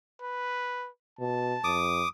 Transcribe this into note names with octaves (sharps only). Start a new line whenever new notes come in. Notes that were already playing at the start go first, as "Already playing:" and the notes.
B4
B2 A5
F2 D6 D#6